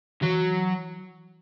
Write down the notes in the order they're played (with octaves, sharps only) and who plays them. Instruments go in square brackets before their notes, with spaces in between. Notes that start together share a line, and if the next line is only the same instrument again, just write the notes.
[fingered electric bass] E3 [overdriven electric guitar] F#3